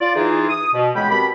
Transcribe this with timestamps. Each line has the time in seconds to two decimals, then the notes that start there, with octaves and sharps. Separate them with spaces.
0.01 F4 D5
0.15 E3 D#4 F4 G#4
0.49 D#6
0.74 B2
0.95 C#2 E3 G#3 B3 G5 B5
1.09 B2 C4 G4 A#4 B5